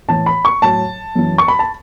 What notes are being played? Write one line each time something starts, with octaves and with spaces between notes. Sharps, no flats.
A2 E3 A5
B5
C#6
A2 F#3 A5
F#2 E3
C#6
B5
A5